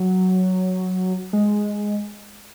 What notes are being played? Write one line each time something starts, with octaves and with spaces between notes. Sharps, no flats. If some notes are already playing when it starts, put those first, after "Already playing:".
Already playing: F#3
G#3